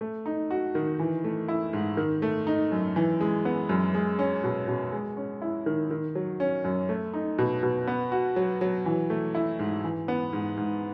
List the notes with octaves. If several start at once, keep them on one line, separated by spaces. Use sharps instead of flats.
A3
D#4
F#4
D#3
E3
A3
E4
G#2
D#3
A3
D#4
F#2
E3
G#3
B3
F#2
G#3
C#4
B2
B2
G#3
C#4
E4
D#3
D#3
F#3
C#4
F#2
A3
D#4
B2
B2
B3
F#4
F#3
F#3
E3
A3
E4
G#2
E3
B3
G#2
G#2